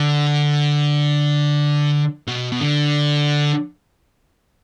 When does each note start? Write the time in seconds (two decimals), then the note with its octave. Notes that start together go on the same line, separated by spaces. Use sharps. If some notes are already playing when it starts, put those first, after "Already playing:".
Already playing: D3
2.28 B2
2.52 B2
2.61 D3